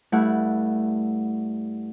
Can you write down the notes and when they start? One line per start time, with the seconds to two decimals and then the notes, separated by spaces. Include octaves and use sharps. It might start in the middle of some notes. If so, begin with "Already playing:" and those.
0.12 G2 A3 E4 F#5